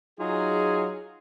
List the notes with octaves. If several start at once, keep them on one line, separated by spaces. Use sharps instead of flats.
F#3 D#4 F4 G#4